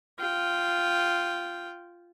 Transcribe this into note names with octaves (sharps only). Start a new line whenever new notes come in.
F4 G5